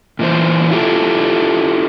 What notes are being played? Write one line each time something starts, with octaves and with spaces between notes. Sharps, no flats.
A#2 E3 C5
E4 F4 G4 A4